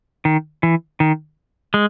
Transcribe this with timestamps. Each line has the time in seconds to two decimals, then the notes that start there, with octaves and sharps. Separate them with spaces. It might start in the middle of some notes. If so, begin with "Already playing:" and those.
0.25 D#3
0.63 E3
1.00 D#3
1.74 G#3